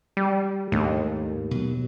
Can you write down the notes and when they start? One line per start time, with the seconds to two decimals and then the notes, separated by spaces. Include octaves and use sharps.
0.17 G3
0.72 D#2 G#2 A3 D4
1.51 B2 F#3